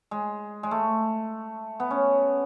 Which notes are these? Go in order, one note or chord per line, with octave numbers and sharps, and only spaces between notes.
G#3
G#3
A3
B3
C#4